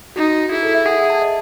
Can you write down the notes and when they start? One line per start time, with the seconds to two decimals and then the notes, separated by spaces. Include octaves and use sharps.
0.16 D#4 F#4
0.51 E4 G#4
0.63 A4
0.75 E5
0.86 G#4 F#5
0.98 E5
1.10 A5
1.22 D#5